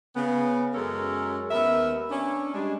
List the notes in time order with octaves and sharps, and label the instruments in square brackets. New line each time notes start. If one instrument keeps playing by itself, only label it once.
[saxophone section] C#3 B3
F#2 G#3 C#4 A4 A#4 C#5
D#2 B3 A#4 E5
C#4 D4
G3 G#3 D4